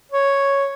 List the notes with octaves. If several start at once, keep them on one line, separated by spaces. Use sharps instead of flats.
C#5